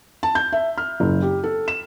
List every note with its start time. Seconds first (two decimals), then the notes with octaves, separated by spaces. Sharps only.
0.23 A5
0.35 G6
0.52 E5
0.78 F6
1.00 F#1
1.22 G4
1.44 A4
1.68 E7